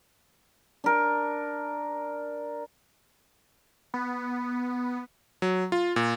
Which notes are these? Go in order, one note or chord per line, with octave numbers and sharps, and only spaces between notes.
D4 A#4
B3
F#3
F4
A#2